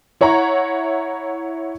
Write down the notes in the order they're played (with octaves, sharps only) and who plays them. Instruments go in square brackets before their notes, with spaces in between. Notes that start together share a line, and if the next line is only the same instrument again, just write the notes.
[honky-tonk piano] E4 C#5 F#5 A#5 C#6